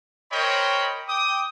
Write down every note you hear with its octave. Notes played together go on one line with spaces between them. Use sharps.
A#4 C5 C#5 D#5 G5 B5
G5 D6 D#6